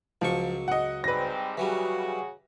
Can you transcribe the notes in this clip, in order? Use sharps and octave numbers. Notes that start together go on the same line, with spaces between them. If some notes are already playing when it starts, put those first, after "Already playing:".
C#2 F3 F#3 C#6
D#5 F#5
G#2 G3 C4 B4 A#6
C#3 E3 F#3 G3 F#4 G#4